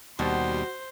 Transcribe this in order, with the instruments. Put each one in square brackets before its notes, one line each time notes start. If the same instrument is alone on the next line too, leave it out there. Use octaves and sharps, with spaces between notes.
[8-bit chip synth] D#2 G3 [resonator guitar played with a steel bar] B2 [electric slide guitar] F#4 [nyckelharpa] C5